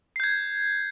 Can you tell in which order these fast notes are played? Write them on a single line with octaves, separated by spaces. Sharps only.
C7 G6 G#6